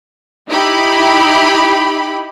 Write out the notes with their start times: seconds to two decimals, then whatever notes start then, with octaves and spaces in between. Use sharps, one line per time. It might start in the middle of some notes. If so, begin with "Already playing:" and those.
0.49 D#4 E4 G4 B5